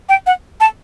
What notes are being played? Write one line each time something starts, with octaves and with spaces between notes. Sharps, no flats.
G5
F#5
A5